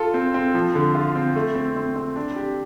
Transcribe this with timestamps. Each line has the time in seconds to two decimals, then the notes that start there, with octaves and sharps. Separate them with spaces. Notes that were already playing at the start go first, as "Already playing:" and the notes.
Already playing: F4 A4
0.14 C4
0.34 C4
0.55 F3
0.75 D3
0.95 F4
1.15 C4
1.36 A3
1.55 C4
1.76 C4
1.96 C4
2.16 D4
2.36 G4